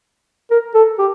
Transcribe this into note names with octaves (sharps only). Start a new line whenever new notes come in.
A#4
A4
G4